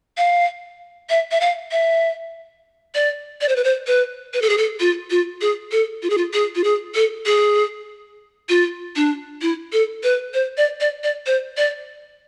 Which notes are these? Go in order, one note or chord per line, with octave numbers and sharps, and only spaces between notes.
F5
E5
E5
F5
E5
D5
D5
C5
B4
C5
B4
B4
A4
G#4
A4
F4
F4
G#4
A4
F4
G#4
F4
G#4
F4
G#4
A4
G#4
F4
D4
E4
A4
B4
C5
D5
D5
D5
C5
D5